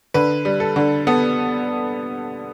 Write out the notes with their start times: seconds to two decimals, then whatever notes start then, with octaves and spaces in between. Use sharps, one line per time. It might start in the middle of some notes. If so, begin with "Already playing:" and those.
0.14 D3 B4
0.45 G3
0.60 A4
0.76 D3
1.07 B3 A4